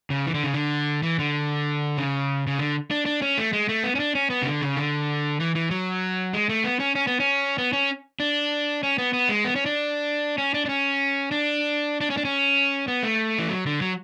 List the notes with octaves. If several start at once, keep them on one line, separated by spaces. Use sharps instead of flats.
C#3
E3
D3
C#3
D3
E3
D3
C#3
C#3
D3
D4
D4
C#4
A3
G#3
A3
B3
C#4
D4
C#4
B3
C#3
D3
C#3
D3
E3
E3
F#3
G#3
A3
B3
C#4
C#4
B3
C#4
B3
C#4
D4
C#4
B3
B3
G#3
B3
C#4
D4
C#4
D4
D4
C#4
D4
D4
C#4
D4
C#4
B3
A3
E3
F#3
D3
F#3